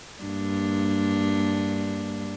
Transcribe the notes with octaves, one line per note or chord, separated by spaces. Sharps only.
G2 A#3 D4